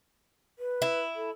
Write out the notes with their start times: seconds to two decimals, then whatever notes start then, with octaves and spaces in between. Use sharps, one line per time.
0.59 B4
0.82 E4
1.16 A4